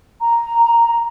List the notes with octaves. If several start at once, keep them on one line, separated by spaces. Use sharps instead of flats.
A#5